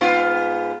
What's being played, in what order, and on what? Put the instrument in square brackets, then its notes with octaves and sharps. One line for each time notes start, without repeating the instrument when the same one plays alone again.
[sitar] G#2 B3 F4